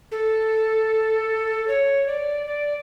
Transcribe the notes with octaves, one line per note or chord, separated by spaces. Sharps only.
A4
C#5
D5
D5